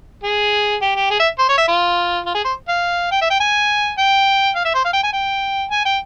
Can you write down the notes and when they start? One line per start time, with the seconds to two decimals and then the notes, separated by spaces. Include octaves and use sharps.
0.23 G#4
0.81 G4
0.96 G4
1.10 G#4
1.19 E5
1.39 C5
1.49 C#5
1.57 E5
1.68 F4
2.26 F4
2.34 G#4
2.44 C5
2.68 F5
3.11 G5
3.21 E5
3.30 G5
3.40 G#5
3.98 G5
4.55 F5
4.65 E5
4.74 C5
4.84 F5
4.93 G5
5.03 G#5
5.13 G5
5.71 G#5
5.85 G5